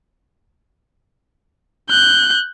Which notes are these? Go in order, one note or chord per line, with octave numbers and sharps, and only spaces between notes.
F#6 G6